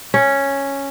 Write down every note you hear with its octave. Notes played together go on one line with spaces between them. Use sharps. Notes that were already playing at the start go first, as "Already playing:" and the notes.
C#4